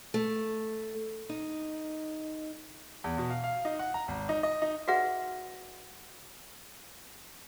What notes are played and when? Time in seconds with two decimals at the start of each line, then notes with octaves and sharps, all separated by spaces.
0.14 A3
1.29 D#4
3.04 E2
3.18 B2
3.30 F5
3.44 F5
3.65 D#4
3.79 F#5
3.94 A#5
4.08 G#1
4.29 D#4
4.43 D#5
4.62 D#4
4.88 F#4 G#4 B4 D5 E5 F#5